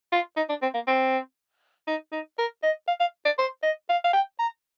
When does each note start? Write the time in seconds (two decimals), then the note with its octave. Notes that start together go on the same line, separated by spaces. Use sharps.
0.12 F4
0.37 D#4
0.49 D4
0.62 C4
0.74 A#3
0.87 C4
1.87 D#4
2.12 D#4
2.39 A#4
2.63 D#5
2.88 F5
3.00 F5
3.25 D5
3.38 C5
3.63 D#5
3.89 F5
4.04 F5
4.13 G5
4.39 A#5